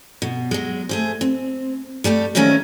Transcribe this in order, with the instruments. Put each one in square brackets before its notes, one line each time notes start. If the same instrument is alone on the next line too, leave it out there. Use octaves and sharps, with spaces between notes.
[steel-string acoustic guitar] B2
F#3 G#3
A3 G#4 C5
C4
G3 A3 G4 A4
G#2 D#3 F3 A3 C#4 A#4